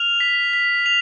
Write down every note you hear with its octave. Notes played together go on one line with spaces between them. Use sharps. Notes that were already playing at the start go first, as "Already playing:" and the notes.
Already playing: F6 F7
B6
B6
F7